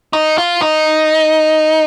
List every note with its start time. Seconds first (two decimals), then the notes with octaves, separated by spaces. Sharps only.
0.13 D#4
0.38 F4
0.62 D#4